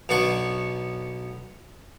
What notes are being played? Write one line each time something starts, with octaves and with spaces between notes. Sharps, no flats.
B1 B3 D4 F#5 C#6